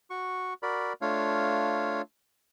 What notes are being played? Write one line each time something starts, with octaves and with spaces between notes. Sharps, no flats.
F#4 C#6
F#4 A#4 D5 B5
A3 D4 F4 C#5 F5